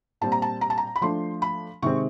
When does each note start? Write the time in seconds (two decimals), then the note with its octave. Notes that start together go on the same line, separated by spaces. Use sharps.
0.21 A#2 G3 C4 A5
0.32 A#5
0.42 A5
0.61 A#5
0.70 A5
0.78 A#5
0.96 B5
1.01 F3 A3 D4 C6
1.42 B5
1.82 C3 D#3 G#3 C4 C#6